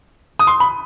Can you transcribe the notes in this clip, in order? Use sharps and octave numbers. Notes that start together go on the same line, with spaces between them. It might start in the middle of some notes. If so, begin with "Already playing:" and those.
D#6
C6
B5